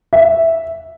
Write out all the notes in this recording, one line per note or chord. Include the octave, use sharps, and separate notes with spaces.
E5